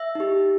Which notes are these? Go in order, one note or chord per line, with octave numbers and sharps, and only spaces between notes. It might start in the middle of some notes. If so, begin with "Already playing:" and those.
Already playing: E5
D#4 G4